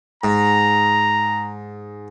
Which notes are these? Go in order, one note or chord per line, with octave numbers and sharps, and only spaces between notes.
G#2 A#5